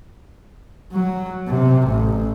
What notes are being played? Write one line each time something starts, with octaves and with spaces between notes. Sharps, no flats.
F#3
C3
A1